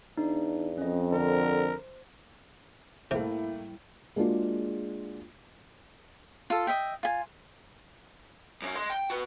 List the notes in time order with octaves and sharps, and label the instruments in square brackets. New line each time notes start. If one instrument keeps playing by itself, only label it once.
[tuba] E2 [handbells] D4 D#4
[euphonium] F2 [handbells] C#4 D#5
[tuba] D3 [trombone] A#4 [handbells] C5
[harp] A2 G3 [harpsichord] C3 [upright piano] A3 A#3 [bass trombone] E4
[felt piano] G#3 A#3 D4 F4 F#4 G#4
[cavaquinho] F4 A4
D#5 E5 G5
F4 G#5
[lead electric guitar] F#2 C#4
D#5 C6
G5
F#4 B4